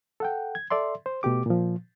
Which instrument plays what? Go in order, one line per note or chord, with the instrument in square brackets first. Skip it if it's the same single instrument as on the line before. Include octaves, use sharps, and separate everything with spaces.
[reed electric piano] A4 F#5 G5
G#6
A4 D5 E5 C6
C5
B2 A3 G4 D6
A#2 F3